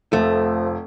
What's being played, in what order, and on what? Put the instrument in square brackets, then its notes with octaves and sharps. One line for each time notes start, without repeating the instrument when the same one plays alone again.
[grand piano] F1 [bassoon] F3 [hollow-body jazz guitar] A3